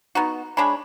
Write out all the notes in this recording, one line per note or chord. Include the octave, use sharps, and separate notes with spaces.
B3 D#4 F#4
G#3 D4 C#5 B5